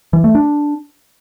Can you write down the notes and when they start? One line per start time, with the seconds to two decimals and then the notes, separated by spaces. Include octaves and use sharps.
0.13 E3
0.24 A3
0.35 D4